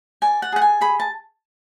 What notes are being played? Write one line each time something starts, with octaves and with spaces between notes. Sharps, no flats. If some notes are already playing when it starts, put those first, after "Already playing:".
D5 G#5
F#5
G#4 F#5
G#5
G#4 B5
A5